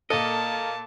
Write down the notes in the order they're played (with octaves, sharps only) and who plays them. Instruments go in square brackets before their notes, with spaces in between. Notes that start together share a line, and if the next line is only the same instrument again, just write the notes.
[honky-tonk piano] A#2 A4 [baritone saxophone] A#3 [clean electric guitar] D#5 [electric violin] A5